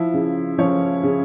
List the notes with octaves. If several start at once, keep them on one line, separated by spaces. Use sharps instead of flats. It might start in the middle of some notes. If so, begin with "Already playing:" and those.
Already playing: F3 E4
C#3
F3 C#4 C#5
C#3